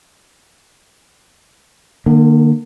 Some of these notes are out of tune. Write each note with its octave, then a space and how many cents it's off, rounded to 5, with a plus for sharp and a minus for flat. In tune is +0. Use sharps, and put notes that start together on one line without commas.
D3 +45 A#3 +0